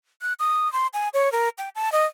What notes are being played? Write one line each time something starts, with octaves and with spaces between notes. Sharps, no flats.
F#6
D#6
C6
G#5
C#5
A#4
G5
A5
D#5